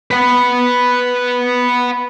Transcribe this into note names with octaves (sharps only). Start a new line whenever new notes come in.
B4 F#5